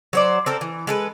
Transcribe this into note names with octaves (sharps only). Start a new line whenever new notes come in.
F#3 C5 D5
C4 A4 A#4
E3
G#3 A4 B4